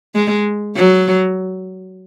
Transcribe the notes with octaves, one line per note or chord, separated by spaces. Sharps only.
G#3
F#3